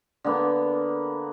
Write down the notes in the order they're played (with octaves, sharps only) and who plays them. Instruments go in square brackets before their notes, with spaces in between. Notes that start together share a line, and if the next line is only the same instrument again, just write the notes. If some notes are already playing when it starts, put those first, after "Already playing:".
[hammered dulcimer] D3 A#3 B3